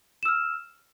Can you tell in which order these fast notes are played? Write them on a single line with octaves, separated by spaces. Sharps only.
E7 E6 F6